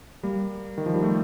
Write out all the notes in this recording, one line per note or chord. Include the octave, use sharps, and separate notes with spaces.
G3 A#3
D#3
F3
G3
A3